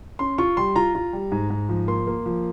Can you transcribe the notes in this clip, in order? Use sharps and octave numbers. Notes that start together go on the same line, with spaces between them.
C#4 C6
F4 C#6
G3 C6
F4 A#5
F4
G3
G#2
G#2
F3
A#3 C6
A#3
F3